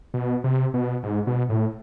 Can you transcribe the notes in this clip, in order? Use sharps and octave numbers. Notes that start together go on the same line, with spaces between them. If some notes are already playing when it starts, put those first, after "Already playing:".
B2
C3
B2
G#2
B2
A2